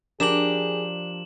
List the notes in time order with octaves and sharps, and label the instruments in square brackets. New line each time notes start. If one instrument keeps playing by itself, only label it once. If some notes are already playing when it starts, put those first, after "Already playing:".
[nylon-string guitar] F3 G4 A#4 [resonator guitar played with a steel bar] D4 [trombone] G#4 [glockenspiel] E7 F#7